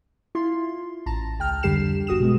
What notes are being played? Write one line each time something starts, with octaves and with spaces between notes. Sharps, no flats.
E4 F4 C6
A1 A5 A#5
C#2 G5 F6
F2 D3 G3 G4 C7 E7
G1 F#4 D#6 E7
B2 G#3 B3